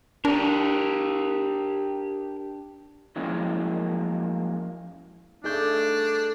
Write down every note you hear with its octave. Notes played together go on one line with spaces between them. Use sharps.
D4 G4 A#4
F3 F#3 G#3 A#3 C#4 E4
G2 A3 D4 D#4 G#4 D6 G6